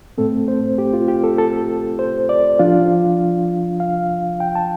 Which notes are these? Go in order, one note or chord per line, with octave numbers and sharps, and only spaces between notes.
A2 A3 C4 A4
C5
G4
F4
G4
A4
A4
C5
D5
F3 D4 F4 F5
F5
G5
A5